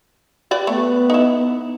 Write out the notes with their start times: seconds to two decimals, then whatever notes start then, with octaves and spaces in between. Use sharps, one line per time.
0.51 G4 B4 D5 G5
0.67 A3 B3
1.10 D#4 E4